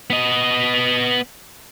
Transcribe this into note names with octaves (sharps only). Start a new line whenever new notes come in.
B3 D#5